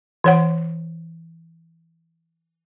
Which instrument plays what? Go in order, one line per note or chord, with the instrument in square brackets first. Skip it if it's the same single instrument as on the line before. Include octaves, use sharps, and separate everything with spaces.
[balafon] E3 C#5 F#5